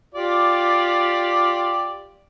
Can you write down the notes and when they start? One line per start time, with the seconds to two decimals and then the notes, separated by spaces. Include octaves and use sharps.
0.14 F4 G4 D5